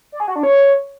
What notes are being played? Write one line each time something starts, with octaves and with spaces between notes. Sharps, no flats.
D5
G#4
F#4
D4
C#5